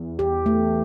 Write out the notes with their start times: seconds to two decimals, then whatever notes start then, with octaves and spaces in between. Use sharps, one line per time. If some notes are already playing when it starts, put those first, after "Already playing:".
Already playing: E2
0.19 G4
0.46 A3